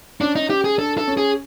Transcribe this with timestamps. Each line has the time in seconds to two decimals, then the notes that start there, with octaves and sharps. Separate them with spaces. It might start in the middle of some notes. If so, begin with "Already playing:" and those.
0.21 C#4 D4
0.36 D#4
0.50 G4
0.64 G#4
0.78 D4 A4
0.98 A4
1.08 C#4
1.17 G#4